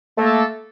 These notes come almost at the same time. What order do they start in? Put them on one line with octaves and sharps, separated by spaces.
A3 A#3 A4